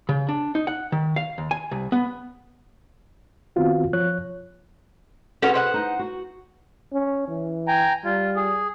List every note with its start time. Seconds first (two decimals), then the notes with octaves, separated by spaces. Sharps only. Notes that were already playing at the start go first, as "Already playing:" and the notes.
0.09 C#3
0.29 D4
0.55 D#4
0.67 F#5
0.92 D#3
1.16 F5
1.38 D#2
1.51 G#5
1.71 C2
1.92 B3
3.56 D#3 B3 C4 F4 F#4
3.93 F3 C#5 F#6
5.42 C#4 F4 F#4 G#4 A4 B4
5.54 C5 D#5 F#5
5.74 D#4
5.99 F#4
6.93 C#4
7.28 E3
7.68 G5 G#5 A#5
8.05 G3 F4
8.36 G#4